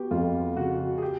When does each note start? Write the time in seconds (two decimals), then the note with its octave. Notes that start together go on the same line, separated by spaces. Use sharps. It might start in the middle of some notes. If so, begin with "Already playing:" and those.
Already playing: B3 F#4 G4
0.11 F2 F4
0.56 C#3 F#4
0.98 G#4
1.02 G4